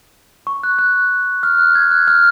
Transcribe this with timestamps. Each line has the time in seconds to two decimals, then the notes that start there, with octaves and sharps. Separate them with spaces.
0.47 C#6
0.64 F#6
0.79 F#6
1.43 F6
1.59 F#6
1.75 G#6
1.91 F#6
2.08 F6